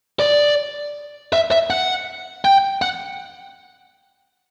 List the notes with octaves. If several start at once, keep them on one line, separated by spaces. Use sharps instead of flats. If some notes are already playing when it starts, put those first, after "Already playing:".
D5
E5
E5
F#5
G5
F#5